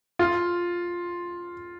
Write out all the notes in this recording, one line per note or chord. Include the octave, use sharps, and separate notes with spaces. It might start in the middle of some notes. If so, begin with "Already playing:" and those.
F4